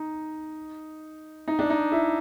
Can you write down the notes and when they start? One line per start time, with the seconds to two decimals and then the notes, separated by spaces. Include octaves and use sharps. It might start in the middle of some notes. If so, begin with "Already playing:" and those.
Already playing: D#4
1.48 D#4
1.59 D4
1.70 D#4
1.92 E4